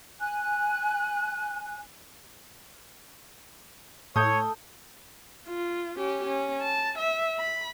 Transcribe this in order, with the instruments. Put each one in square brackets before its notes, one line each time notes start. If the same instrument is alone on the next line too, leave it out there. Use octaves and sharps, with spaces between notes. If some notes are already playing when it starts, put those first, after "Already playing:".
[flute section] G#5 F#6
[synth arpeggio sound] A2 [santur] A4 [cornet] C#5 [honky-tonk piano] D#6 G6
[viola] F4
C#4 G4
C#4
A5
E5
B5